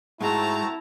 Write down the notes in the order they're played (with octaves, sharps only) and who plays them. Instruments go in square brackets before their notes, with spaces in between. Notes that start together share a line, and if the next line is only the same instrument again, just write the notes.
[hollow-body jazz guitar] G#2 [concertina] A3 C4 F#4 [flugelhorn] E4 [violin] A5 A#5